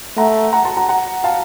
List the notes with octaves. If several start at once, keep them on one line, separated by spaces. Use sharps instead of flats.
A3 F#5 A#5
F#5 A#5
A5 C6
F#5 A#5
F#5 A#5
F5 A5